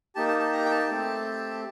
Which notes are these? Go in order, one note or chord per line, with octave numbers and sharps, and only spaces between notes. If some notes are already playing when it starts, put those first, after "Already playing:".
A#3 D#4 G4 A5
A5
A5
A#5
G5
A5
A3 C4 G4